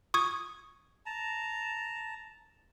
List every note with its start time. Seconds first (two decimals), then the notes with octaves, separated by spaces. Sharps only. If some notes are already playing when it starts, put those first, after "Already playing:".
0.14 C#6 D#6 G#6
1.06 A5 A#5